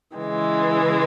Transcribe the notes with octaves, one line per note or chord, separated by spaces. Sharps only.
C#3 E3 G#3